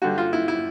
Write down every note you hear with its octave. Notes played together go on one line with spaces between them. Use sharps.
G2 D3 G3 F#4
F4
E4
E4